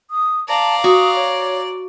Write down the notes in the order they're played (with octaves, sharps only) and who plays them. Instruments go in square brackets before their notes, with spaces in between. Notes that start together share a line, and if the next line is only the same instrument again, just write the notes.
[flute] D#6
[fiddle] D5 [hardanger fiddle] F5 A#5 [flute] A5
[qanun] F#4 [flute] D#6
[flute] C#5